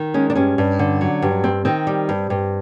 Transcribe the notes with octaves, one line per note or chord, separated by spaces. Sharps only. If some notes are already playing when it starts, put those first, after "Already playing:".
Already playing: D#3
G#3 C#4
D4
G2 C#4
G2
D3
F#3
G2
C4
D#3 C4
G3
G2
G2